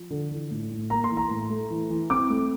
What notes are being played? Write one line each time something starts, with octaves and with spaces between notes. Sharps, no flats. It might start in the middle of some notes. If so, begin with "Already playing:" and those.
Already playing: F3
D3
E3
A2
A2
A#3 A#5
C6
E3
A#5
A2
A3
E3
E3
C4 D6
A3